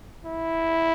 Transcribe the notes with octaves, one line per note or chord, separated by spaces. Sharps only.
E4